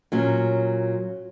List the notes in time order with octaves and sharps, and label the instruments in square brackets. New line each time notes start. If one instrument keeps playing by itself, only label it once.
[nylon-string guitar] A#2 F#3 C#4